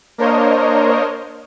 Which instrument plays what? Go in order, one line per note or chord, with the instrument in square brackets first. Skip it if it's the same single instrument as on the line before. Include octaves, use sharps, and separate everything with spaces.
[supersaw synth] A#3 D4 A#4 C5 C#5 D#5